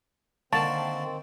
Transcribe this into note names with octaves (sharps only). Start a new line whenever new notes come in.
D3 D#3 A#3 C4 C5 A5 C#6